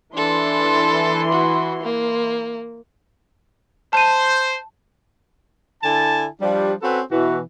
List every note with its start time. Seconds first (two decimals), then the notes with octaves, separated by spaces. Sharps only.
0.16 E3 D4 A4 C6
1.32 F#4
1.83 A#3
3.93 C5 A5 D#7
5.83 D3 E4 G#5 A5
6.41 F3 G3 D4
6.82 C4 C#4 F#4 A4 B4
7.11 B2 E3 F#4